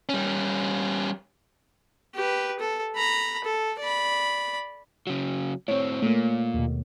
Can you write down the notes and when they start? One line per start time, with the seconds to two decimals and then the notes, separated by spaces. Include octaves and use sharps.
0.09 G3 C#4
2.15 G4 B4
2.59 A4
2.95 A#5 B5
3.44 A4
3.80 D5 B5
5.07 C#3 F#3
5.68 A2 C4 C#5
6.02 A#2 A3 A#3
6.54 D#2 B2